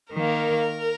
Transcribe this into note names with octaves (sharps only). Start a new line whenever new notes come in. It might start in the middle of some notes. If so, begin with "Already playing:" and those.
D#3 A#3 A#4